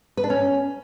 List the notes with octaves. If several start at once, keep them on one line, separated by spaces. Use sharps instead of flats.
B4
D4
C#4